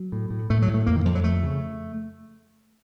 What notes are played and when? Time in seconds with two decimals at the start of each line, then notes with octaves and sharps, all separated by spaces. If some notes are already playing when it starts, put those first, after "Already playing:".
Already playing: F#3
0.12 A2
0.31 A2
0.50 A2 A3
0.62 F#3
0.68 A2
0.74 A3
0.86 F2 A#3
0.96 D#3
1.05 F2 F3
1.15 F#3
1.24 F2 A3
1.43 C#3